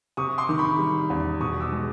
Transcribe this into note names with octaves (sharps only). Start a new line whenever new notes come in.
C3 C#6 D#6
C6 D6
D#3
B5 C#6
G3
E2
B2 C#6 D#6
D6 E6
G#3